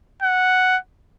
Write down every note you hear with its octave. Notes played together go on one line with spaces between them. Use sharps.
F#5